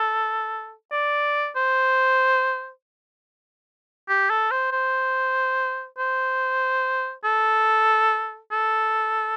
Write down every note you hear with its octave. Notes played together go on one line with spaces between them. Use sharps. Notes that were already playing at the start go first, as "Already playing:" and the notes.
Already playing: A4
D5
C5
G4
A4
C5
C5
C5
A4
A4